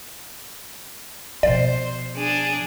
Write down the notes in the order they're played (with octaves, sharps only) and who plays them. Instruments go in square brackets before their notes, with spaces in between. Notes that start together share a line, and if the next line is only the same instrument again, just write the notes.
[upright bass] B2 F3 [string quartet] C5 [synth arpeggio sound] D5
[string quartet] D4 G#4